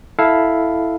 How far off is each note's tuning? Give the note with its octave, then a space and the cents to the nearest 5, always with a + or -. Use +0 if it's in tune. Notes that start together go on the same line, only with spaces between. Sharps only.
E4 +0 A4 -5 F5 +0